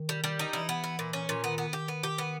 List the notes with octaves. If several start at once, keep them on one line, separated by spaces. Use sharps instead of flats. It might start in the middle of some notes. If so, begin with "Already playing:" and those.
Already playing: D#3
G3
G3
D#4
E3 E4
B3
E4
A#2
C#4
A#2
D#3 B3
B3
G4
B3
G4
B3